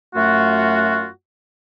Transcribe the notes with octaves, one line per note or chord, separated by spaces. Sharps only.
F#2 A3 F4 F#4